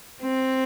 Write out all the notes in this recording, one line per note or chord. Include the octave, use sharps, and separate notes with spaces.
C4